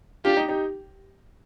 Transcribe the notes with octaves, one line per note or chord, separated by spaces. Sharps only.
D4 F4 G4
D#4 G4
D#4 G4